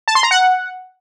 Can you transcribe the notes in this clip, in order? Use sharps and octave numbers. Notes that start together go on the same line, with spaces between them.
A5
C6
A#5
F#5